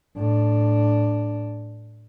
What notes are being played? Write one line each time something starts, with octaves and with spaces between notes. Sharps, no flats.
A2 D4